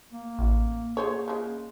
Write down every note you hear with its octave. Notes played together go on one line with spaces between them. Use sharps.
A#3
A1
A#3 G#4 C5 C#5
C#3 G#3